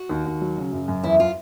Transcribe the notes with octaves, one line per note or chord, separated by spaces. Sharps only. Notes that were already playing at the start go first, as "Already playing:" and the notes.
Already playing: F#4
D#2
D#2
F#3
C#3
F#2
F#2
E2 E4
F4